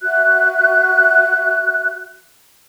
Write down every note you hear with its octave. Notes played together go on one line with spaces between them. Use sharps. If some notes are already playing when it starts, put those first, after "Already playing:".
F#4 E5 F#6